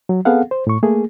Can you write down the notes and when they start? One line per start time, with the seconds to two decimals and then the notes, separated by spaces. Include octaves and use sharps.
0.09 F#3
0.25 B3 C4 G#4 A4 F5 F#5
0.51 C5
0.67 A2 C#6
0.83 A3 A#3 G#4